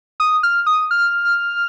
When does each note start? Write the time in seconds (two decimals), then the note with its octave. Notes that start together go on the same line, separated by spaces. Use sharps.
0.20 D#6
0.43 F6
0.66 D#6
0.91 F6